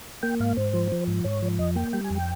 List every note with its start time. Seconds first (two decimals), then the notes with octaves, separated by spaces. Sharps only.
0.23 A#3 G5
0.40 G#2 F5
0.57 G#2 C5
0.74 F3
0.92 F3
1.07 G#2
1.24 G#2 C#5
1.42 F3
1.59 F2 D#5
1.75 A#3 G5
1.93 G3 G5
2.04 G#5
2.10 F2
2.15 G5